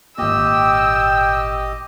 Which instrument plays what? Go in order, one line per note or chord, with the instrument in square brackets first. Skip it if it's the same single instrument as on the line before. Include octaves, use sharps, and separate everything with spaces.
[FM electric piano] G#1 A#2 [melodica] G4 D#5 [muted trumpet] G5 [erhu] E6